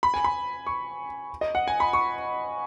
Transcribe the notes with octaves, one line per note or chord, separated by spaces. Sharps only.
B5
G#5
B5
C#6
D#5
F#5
G#5
B5
C#6